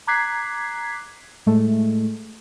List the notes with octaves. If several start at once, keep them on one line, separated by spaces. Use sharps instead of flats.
A#5 D6 F#6 G#6 B6 C7
A2 G#3 A3